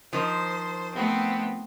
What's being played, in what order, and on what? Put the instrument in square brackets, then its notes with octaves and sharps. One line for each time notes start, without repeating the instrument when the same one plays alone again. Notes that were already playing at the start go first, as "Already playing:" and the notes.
[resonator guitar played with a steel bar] D#3 F3 [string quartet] C5
[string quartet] A3 B3 C4